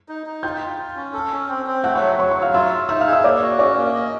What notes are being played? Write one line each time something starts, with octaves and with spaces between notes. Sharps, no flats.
D#4
D#4
F4 G5 G6
F4
F4
C#4
A4
C#4
C4
C4
A3 F#5 F#6
C#5 C#6
F#3
F#3 C#5 C#6
C#5 C#6
F#3
F5 F6
F4 E5 E6
F4
D#4 E5 E6
F5 F6
G#4
E5 E6
A#3 D5 D6
F#4
C#4 D5 D6
A#3
D#5